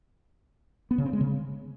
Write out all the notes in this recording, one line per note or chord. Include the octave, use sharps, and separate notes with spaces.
B3
C#3
C4
G#3
C#3